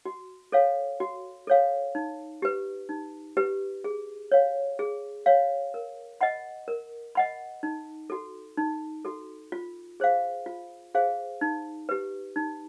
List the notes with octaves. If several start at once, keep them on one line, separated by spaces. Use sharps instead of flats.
F#4
A4 C#5 F5
F#4
A4 C#5 F5
D#4
G4 B4
D#4
G4 B4
G#4
C#5 F5
G#4
C#5 F5
A#4
D#5 F#5 B5
A#4
D#5 F#5 B5
D#4
F#4 A4
D#4
F#4 A4
F4
G#4 C5 F5
F4
G#4 C5 F5
D#4
G4 B4
D#4